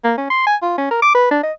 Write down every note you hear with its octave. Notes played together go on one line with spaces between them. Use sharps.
A#3
C#4
C6
G#5
F4
C#4
A#4
D6
B4
D4
D#5